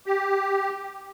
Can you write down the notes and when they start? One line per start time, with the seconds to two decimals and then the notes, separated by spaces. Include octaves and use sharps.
0.06 G4